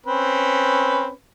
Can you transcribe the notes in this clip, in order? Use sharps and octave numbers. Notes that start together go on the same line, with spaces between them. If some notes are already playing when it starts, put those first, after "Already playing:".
C4 C#4 B4